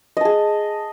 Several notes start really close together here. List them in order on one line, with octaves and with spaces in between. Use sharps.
D#5 A5 G#4